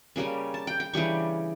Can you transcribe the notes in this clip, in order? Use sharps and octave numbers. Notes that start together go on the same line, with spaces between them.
C#3 G3 A#3 C#4
A5
G5
G5
C#3 E3 G3 D4 C#6